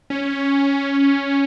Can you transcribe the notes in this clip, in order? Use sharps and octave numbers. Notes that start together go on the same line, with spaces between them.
C#4